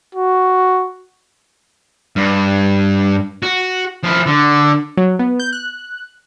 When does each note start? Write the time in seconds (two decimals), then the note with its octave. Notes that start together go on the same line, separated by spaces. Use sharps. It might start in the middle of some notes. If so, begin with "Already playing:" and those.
0.15 F#4
2.16 G2
3.43 F#4
4.04 F3 E4
4.27 D3
4.97 F#3
5.19 B3
5.40 G6
5.53 F#6